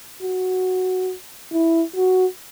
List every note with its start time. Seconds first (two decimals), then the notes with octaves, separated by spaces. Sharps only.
0.23 F#4
1.53 E4
1.96 F#4